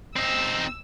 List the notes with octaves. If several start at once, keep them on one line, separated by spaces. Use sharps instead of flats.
C4 D#4 E6